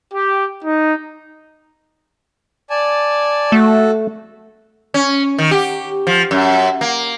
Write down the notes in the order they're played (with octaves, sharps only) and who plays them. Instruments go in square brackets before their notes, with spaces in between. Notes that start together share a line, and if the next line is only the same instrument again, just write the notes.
[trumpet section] G4
D#4
[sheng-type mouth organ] D5 G#5 A5
[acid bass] A3 [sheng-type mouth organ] F#4 A4
[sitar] C#4
D#3
G4
F3
F#2
A#3